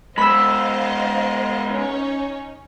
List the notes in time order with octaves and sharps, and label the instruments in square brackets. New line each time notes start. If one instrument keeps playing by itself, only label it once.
[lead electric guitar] G#3 B3 [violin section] C5 D#5 F5 [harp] B5 E6
[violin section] C#4 D#4 C#5